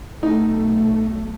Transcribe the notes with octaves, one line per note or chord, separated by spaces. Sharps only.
B1 B2 A3 D#4